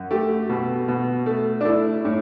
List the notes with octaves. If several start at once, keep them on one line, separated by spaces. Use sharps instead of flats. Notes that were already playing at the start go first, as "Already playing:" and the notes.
Already playing: F#2
A3 G4
B2
B2
A3
D4
A3 E4
A2